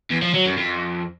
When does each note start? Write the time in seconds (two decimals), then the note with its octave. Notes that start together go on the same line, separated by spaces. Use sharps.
0.11 E2
0.22 F3
0.34 F#3
0.46 F#2
0.57 F2